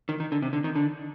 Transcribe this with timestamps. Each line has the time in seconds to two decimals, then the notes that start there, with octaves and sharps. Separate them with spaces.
0.09 D#3
0.20 D#3
0.32 D3
0.42 C3
0.53 D3
0.64 D#3
0.76 D3